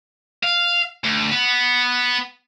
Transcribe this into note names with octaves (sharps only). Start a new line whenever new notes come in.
F5
D2
B3